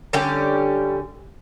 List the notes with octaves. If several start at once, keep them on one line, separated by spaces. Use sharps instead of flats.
D3 G3 C#4 G4